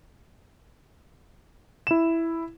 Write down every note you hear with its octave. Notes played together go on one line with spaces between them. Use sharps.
E4 E7